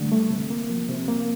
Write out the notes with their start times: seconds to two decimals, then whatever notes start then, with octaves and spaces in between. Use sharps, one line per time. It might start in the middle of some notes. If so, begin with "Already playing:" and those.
Already playing: D3 G3 A3
0.12 A3
0.30 C3
0.50 A#3
0.70 F3
0.89 C3
1.08 A#3